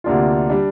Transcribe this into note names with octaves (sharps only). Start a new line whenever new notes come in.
D2 C3 A#3 D4 F4
G3 D4